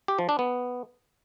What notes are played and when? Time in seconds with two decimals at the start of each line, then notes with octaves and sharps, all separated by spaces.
0.08 G4
0.19 F3
0.29 D4
0.39 B3